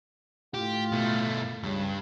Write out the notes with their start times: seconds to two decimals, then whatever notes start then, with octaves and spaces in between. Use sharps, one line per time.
0.54 A2 F4 G4
0.92 B2 A3
1.64 C#2 G2